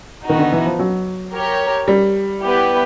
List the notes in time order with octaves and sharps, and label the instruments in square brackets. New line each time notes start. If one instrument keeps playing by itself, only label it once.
[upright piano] D#3 [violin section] B3 D#4 F#4
[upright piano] D3
E3
F3
F#3
[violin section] G4 A#4 C#5
[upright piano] G3
[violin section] B3 E4 G4 B4